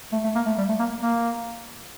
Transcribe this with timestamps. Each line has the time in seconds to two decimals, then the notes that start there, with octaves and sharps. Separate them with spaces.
0.12 A3
0.24 A3
0.35 A#3
0.47 A3
0.58 G3
0.69 A3
0.79 A#3
1.03 A#3